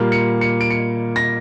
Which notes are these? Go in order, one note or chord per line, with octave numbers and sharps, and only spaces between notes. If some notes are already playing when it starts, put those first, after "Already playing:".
Already playing: A#2 G3 A#3
C#7
C#7
D7
C#7
A#6